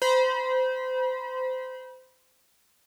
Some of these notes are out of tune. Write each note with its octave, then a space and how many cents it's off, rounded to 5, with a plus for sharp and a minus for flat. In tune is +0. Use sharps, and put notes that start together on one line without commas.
C5 -25 B5 -35